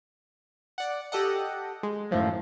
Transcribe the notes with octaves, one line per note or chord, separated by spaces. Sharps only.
D5 F#5
G4 A4 D#5 F#5
G#3
F#2 A2 D#3 F3 F#3